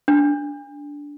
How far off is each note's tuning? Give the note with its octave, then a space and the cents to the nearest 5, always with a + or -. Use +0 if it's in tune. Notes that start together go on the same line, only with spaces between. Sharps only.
D4 -15